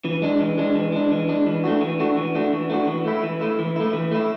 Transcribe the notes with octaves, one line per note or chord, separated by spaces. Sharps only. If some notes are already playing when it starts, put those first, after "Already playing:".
E3
G#3 D4
E3
G#3 D4
E3
G#3 D4
E3
G#3 D4
E3
A3 D4 F#4
E3
A3 D4 F#4
E3
A3 D4 F#4
E3
A3 D4 F#4
E3
A3 E4
E3
A3 E4
E3
A3 E4
E3
A3 E4